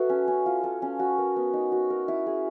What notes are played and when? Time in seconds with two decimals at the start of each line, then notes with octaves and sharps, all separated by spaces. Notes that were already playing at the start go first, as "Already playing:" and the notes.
Already playing: F#4 A4 B4 E5
0.09 C#4
0.28 C#4
0.46 F4
0.64 A4
0.82 C#4
0.99 F#4
1.18 A#4
1.36 B3
1.53 D#4
1.72 F#4
1.90 A#4
2.08 E4
2.26 G#4